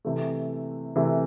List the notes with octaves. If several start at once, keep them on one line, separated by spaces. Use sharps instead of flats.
C3 E3 A3
C3 E3 A3